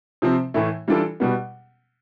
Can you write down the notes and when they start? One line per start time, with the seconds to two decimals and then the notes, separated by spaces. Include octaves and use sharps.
0.22 C3 F3 C4
0.54 A2 E3 A3
0.88 E3 G3 D4 F4 A4
1.20 B2 G3 B3